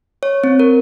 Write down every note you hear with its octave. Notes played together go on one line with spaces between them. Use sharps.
C#5
C4
A#4